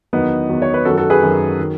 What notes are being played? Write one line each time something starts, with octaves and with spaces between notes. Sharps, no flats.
E2 D#3 F#3 B3 D#4
E2 D#3 F#3
C#5
B4
F#2 D#3 F#3 F#4 A4
F#4 A4
G#4 B4
F#2 D#3 F#3
D#3 F#3